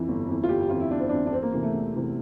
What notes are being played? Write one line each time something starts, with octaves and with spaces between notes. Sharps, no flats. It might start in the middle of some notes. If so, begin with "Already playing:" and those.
Already playing: F2 E3
G1
F2 E3
F4
G1 G4
G4
F2 E3 F4
E4
G1 D4
C4
F2 E3 D4
D4
E2 C4
A#3
C3 E3 A#3
A3
E2
C3 E3